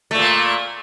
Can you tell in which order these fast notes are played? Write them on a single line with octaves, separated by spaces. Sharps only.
A3 A#2 A#3